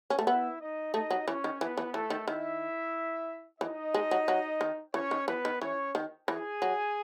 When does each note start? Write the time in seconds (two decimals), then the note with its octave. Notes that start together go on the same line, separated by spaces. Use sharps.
0.10 C#4
0.19 A3
0.27 B3 E4 E5
0.60 D#4 D#5
0.94 A3 D#4 D#5
1.11 F#3
1.27 E3 C#4 C#5
1.44 D#3
1.61 E3 B3 B4
1.77 E3
1.94 E3 A3 A4
2.10 D#3
2.27 D#3 E4 E5
3.61 E3 D#4 D#5
3.94 G#3
4.11 F#3
4.28 F#3
4.61 D#3
4.94 E3 C#4 C#5
5.11 D#3
5.28 E3 B3 B4
5.45 D#3
5.62 E3 C#4 C#5
5.95 D#3
6.28 E3 G#4 G#5
6.62 F#3